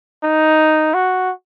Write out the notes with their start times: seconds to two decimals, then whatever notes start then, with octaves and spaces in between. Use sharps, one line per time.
0.23 D#4
0.94 F#4